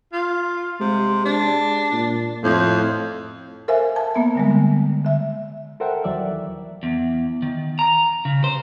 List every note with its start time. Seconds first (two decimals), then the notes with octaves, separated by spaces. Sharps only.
0.13 F4
0.80 C3 G#3
1.25 D4
1.92 A#2
2.43 F2 A2
3.68 A4 A#4 C5 E5 F5 G#5
3.96 A5
4.15 A#3 B3 E5
4.35 D3 G3 G#3
4.51 D3
5.04 D3 E5
5.80 A4 A#4 C5 E5 F#5 G5
6.04 D#2 E3 F#3 D5 E5
6.83 E2
7.42 D#3
7.79 A#5
8.25 C#3
8.44 C5